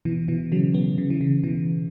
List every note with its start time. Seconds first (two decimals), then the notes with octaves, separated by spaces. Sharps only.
0.05 B2 E3
0.28 B2 E3
0.52 C#3 F#3
0.74 F#3 B3
0.98 C#3
1.10 E3
1.21 C#3
1.43 B2 E3